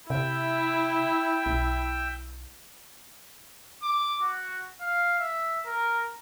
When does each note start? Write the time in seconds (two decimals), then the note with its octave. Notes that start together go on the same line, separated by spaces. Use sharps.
0.10 C3 E4 E5 G5
1.46 B1
3.83 D6
4.23 F#4
4.81 F5
5.19 E5
5.66 A#4